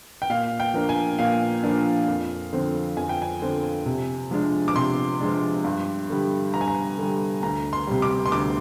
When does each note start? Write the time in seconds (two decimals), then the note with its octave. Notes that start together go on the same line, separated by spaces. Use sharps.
0.22 G5
0.30 A#2 F5
0.60 G5
0.74 F3 A#3 D4
0.89 G#5
1.18 A#2 F5
1.63 F3 A#3 D4
2.08 F2
2.53 D3 F3 C4
2.97 F2 G#5
3.09 G5
3.22 G#5
3.42 D3 F3 C4
3.86 C3
4.31 F3 G#3 D4
4.68 D6
4.75 C3 C6
5.20 F3 G#3 D4
5.64 G2
6.10 D3 G3
6.54 G2 A#5
6.61 G#5
6.68 A#5
6.98 D3 G3
7.43 D2 A#5
7.73 C6
7.87 C3 G3
8.02 D6
8.26 C6
8.32 D2 D6